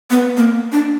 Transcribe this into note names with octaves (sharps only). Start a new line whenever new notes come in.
B3
A#3
D4